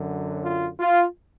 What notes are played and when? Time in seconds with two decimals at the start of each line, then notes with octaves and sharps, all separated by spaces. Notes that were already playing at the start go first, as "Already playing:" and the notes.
Already playing: F#2 D3 F#3
0.44 F4
0.79 F4